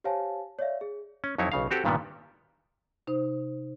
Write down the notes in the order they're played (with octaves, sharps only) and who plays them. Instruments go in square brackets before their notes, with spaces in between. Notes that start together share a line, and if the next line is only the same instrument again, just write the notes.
[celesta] G4 C5 C#5 F5 G#5 A5
C#5 D5 E5 F5
G#4
[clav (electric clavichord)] C#4
F2 F#3 D#4 E4 C#5
B1 C#3 F5
C4 F#4 G4 A4
G2 A#2 D#3 G3 B3
[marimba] C3 D#4 C5